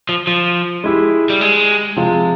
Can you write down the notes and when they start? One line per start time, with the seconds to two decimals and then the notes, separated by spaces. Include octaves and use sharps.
0.09 F3
0.27 F3
0.84 G#3 E4 G4
1.30 G3
1.41 G#3
1.96 C3 F3 G#3 C4